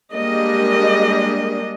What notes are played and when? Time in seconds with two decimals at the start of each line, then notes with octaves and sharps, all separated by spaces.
0.14 G3 G#3 A#3 D4 D#5